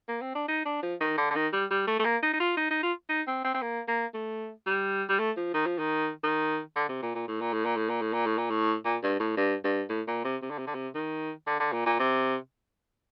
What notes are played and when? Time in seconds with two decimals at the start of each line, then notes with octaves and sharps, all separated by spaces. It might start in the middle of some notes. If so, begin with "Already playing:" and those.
0.08 A#3
0.21 C4
0.35 D4
0.48 D#4
0.65 D4
0.83 F3
1.01 D#3
1.18 D3
1.31 D3
1.35 D#3
1.53 G3
1.70 G3
1.87 A3
1.99 A3
2.05 A#3
2.23 D#4
2.33 D#4
2.40 F4
2.57 D#4
2.71 D#4
2.83 F4
3.09 D#4
3.27 C4
3.44 C4
3.54 C4
3.62 A#3
3.88 A#3
4.14 A3
4.67 G3
5.09 G3
5.19 A3
5.37 F3
5.54 D#3
5.66 F3
5.79 D#3
6.23 D#3
6.76 D3
6.89 C3
7.02 A#2
7.15 A#2
7.28 A2
7.41 A#2
7.53 A2
7.65 A#2
7.77 A2
7.89 A#2
8.01 A2
8.13 A#2
8.26 A2
8.38 A#2
8.50 A2
8.85 A#2
9.03 G2
9.20 A2
9.37 G2
9.64 G2
9.89 A2
10.08 A#2
10.24 C3
10.42 C3
10.50 D3
10.58 C3
10.67 D3
10.75 C3
10.95 D#3
11.47 D3
11.60 D3
11.73 A#2
11.86 A#2
11.99 C3